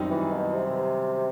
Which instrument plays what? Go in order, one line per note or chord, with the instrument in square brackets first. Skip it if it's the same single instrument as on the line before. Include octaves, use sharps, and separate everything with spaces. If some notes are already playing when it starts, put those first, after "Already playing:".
Already playing: [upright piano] F#2 D#3 G3 C4 D#4
[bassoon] E3
B2
C3